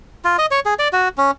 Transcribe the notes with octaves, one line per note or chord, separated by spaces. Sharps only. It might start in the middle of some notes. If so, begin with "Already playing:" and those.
F4
D#5
C#5
G#4
D5
F#4
C#4